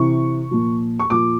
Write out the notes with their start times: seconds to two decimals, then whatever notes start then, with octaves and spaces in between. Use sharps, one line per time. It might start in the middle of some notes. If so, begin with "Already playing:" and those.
Already playing: C3 E3 C#6
0.51 A#2 F3
1.00 C#6
1.10 A#2 F3 D6